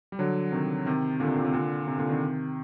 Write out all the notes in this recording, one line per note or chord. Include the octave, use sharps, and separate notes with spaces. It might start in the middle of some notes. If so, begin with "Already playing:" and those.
G3
D3 F#3
C3 D#3
C3 D#3
A#2 D3
C3
A#2
C3
A#2 D3
C3
A#2 D3
C3 D#3